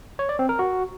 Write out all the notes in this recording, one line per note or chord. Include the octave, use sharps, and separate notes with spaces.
C#5
D5
C4
A#4
F#4